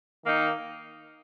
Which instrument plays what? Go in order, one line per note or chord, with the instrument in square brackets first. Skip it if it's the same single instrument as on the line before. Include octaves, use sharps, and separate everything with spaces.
[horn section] D#3 A#3 D#4